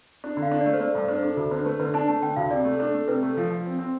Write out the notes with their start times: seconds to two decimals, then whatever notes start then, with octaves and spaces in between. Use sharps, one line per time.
0.24 D4
0.37 D3
0.42 F5
0.51 D4
0.61 D5
0.66 A3
0.73 C5
0.80 A3 D5
0.94 G2 C5
1.08 D4 C5
1.23 D4 A4
1.37 D2 A4
1.51 D3 C5
1.65 A3 B4
1.80 D3 B4
1.94 D4 A5
2.08 A3 A5
2.22 D3 G5
2.36 D2 F5
2.50 C3 D5
2.65 A3
2.79 D4 A4
2.94 A3
3.08 C3 B4
3.22 A3
3.37 F3
3.50 F3
3.66 C4
3.79 C4